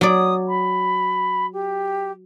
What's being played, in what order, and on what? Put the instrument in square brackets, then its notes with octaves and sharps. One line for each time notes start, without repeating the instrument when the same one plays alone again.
[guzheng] F#3 D5 [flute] D#6
[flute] B5
G4